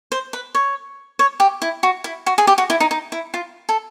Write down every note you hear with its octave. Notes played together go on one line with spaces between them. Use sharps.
C5
B4
C#5
C#5
G4
E4
F#4
E4
F#4
G#4
G4
F#4
E4
D#4
D#4
E4
F4
A4